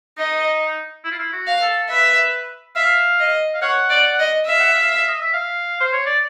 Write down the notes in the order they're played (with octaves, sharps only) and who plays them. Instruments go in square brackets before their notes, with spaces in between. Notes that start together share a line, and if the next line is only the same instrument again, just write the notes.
[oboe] D#4 [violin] D#5
[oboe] E4
F4
E4
F#4
[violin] F5
[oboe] A4
[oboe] B4 [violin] E5
[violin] E5 [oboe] F5
[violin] D#5
[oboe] F5
[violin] C#5 [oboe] F#5
[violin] D5
D#5
[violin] E5 [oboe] F5
[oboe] F#5
F5
D#5
E5
F5
C5
C#5
D5